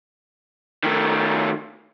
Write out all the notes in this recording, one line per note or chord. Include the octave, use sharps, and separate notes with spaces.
D#3 A3